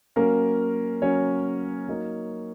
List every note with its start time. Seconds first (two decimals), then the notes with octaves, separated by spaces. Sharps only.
0.16 F#3 A#3 C#4 A#4
1.02 F#3 C#4 C#5
1.88 F#3 A#3 D#4